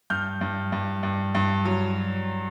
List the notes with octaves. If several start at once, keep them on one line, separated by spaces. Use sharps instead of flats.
G2 F6 G6
G2
G2
G2
G2
F#3